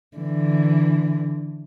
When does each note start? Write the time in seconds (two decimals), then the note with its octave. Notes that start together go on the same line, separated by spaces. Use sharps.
0.17 D3 E3